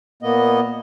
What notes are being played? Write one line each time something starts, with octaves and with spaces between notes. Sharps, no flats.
A#2 A#3 B3 D#5